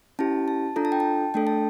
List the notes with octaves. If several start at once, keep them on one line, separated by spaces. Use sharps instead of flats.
C#4 E4 G4 A5
A5
D4 F4 A4 A#5
A5
G5
A5
A3 D4 A4 G5
A5